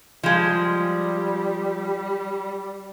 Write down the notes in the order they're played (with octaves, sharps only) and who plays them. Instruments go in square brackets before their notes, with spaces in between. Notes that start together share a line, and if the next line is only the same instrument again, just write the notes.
[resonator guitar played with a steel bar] F3 G#3 [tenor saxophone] G3